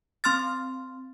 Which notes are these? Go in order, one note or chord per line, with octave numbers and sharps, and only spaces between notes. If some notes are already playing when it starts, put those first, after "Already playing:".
C4 C6 F6 A6